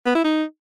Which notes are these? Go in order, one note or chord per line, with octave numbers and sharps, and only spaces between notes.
B3
E4
D#4